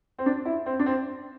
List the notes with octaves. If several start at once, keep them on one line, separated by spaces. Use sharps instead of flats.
C4
D4
E4
C4
D4
C4